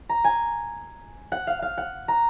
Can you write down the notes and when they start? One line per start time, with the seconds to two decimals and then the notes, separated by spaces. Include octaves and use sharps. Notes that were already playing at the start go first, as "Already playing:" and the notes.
0.09 A#5
0.24 G#5
1.32 F#5
1.47 F5
1.62 F5
1.78 F#5
2.08 A#5